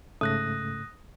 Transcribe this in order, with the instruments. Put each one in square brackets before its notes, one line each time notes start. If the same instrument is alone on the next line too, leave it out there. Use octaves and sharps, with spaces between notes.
[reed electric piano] G#2 C#3 A3 [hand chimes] D#6 F#6 A#6